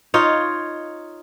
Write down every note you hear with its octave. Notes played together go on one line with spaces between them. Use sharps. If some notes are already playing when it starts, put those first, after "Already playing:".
D#4 F4 C#5